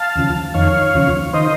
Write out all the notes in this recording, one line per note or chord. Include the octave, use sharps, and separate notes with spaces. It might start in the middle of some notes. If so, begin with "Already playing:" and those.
Already playing: F5 A5
D#2 C#3 F3
F2 D#3 C#5 F5
D#2 C#3 F3
D#3 C5 D#5